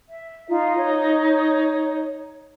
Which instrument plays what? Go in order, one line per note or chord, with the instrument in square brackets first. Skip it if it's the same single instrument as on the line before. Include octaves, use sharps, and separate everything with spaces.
[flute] E5
[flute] D#4 [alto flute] F4
[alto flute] C#5